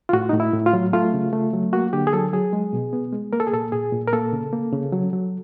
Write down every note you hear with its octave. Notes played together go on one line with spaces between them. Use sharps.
F4
A2 F#4
A2 D#4
E4
A2
F4
F#3
A3 F4
C#3
A3
F#3
A#3 F#4
D3 G4
G#4
F#3 A4
F#3 G#4
G#3
B2
B3
G#3
A#3 A#4
A4
G#4
A#2 A4
A#2 G#4
A#2
A#4
A#3 A4
C#3
A#3
C#3
F#3
F#3